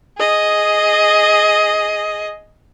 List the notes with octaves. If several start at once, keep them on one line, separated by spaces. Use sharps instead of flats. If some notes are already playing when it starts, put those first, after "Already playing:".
G#4 D#5